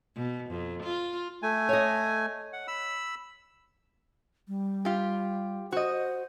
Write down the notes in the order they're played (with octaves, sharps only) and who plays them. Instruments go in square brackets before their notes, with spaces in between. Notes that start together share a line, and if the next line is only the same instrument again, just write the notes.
[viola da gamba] B2
F2
F4
[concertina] A3 G#5
[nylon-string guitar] C#5 D#5
[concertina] F#5
B5 E6
[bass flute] G3
[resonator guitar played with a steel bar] F4 G4
[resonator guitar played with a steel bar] F#4 D#5 [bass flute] C5